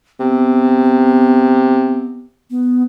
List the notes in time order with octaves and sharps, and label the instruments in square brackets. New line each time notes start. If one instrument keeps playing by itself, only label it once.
[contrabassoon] C3 [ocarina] B3
[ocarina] B3